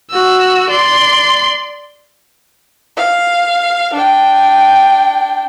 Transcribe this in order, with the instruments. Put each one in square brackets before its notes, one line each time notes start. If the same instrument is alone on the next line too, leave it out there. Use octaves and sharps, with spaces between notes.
[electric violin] F#4 E6
D5 C6
[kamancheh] F5
D4 G5